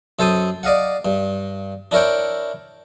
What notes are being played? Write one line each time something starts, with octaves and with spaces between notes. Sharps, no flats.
F#2 A4 C5 A5 D#6
D5 D#5 F5 F#5
G2
D4 E4 A#4 C#5 G5